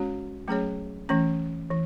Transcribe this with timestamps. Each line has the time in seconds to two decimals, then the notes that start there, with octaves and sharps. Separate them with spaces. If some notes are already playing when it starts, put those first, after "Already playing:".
Already playing: G#3 C#4 F#4 C#5
0.48 F#3 A3 C#4 G#4 C#5
1.09 E3 A3 C#4
1.71 E3